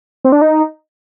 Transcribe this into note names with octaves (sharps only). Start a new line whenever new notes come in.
C4
D4
D#4